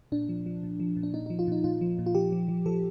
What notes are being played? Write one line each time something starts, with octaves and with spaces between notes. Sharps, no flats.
A#2 D4
F3
F3
A#2
F3
A#2
D4
A#2 D#4
D#4
F3
F4
A#2 D#4
A#2 F4
F3
A#2
F4
F3 G4
F3
F3
F3 A4